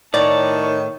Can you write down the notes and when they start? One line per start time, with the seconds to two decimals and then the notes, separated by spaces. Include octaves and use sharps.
0.14 A2 D#3 E4 C#5 D5 A5 A#5